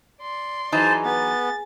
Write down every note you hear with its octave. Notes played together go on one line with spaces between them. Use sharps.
D5 C6
E3 F#3 D#4 G#4 C5 G#5 A5
B3 A6